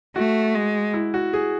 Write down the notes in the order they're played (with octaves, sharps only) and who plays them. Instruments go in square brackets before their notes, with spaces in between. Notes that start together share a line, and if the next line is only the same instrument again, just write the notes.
[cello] A3 [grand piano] F#4
[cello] G#3
[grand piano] E4
F#4
G#4